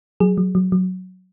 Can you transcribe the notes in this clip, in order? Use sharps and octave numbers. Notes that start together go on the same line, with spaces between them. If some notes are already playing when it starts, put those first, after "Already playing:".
F#3 G#4
F#3
F#3
F#3